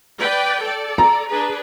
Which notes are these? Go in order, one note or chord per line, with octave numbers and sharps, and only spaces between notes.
B4 D5 G5
A4 D5
A#5
D4 G#4 B4